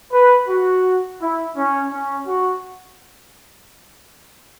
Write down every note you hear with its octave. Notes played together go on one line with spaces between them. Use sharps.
B4
F#4
E4
C#4
C#4
F#4